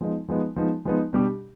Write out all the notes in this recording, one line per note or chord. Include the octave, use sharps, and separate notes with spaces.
F3 G#3 B3 D#4
F3 G#3 B3 D#4
F3 G#3 B3 D#4
F3 G#3 B3 D#4
B2 G3 D4 G4